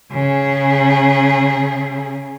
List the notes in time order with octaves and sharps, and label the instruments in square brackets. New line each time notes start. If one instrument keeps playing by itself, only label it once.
[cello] C#3 G#4